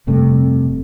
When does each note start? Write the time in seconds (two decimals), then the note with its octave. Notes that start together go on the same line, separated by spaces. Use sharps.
0.07 F1 G2 C3 A3